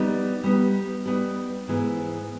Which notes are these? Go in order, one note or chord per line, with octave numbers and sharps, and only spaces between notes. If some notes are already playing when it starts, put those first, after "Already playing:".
Already playing: G3 B3 D#4
G3 B3 D#4
G3 B3 D#4
G#2 E3 G#3 B3